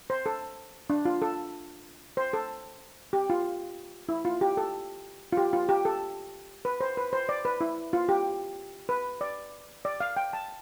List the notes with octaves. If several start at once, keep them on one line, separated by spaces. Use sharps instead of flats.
C5
A4
D4
F4
A4
C5
A4
G4
F4
E4
F4
G4
A4
F4
G4
F4
G4
A4
B4
C5
B4
C5
D5
B4
E4
F4
G4
B4
D5
D5
F5
G5
A5